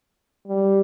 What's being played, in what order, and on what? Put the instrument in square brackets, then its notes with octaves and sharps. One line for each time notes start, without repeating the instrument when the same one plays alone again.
[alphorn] G3